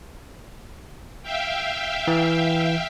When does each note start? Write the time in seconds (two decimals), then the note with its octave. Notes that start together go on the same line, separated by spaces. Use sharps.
1.23 E5 F5 G5
2.07 E3